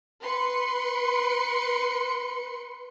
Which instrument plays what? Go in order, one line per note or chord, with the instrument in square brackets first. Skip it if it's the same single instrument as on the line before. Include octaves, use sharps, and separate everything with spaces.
[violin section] B4 C6 C#7